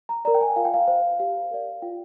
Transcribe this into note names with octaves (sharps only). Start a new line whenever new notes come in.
A#5
A#4 D5 A#5
G5
G#5
F4 F5
G5
F5
C5 F5
G4 F5
A#4 D5
F4 G5